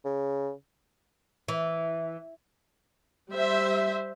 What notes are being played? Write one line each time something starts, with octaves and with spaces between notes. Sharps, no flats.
C#3
E3
G3 C5 E5